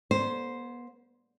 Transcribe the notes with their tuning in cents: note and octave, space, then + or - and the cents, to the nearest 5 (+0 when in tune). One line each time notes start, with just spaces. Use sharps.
B3 -35 C5 +0